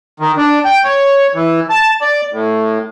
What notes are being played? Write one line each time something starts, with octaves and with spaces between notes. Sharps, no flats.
D#3
D4
G5
C#5
E3
A5
D5
A2